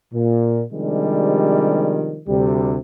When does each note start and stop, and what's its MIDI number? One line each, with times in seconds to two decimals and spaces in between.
0.14 0.63 46
0.73 2.19 48
0.73 2.19 51
0.73 2.19 53
0.73 2.19 55
0.73 2.19 56
0.73 2.19 62
2.27 2.77 38
2.27 2.77 48
2.27 2.77 55